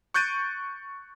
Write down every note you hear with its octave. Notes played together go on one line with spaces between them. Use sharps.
C#6 F#6 G6 A6 D7 D#7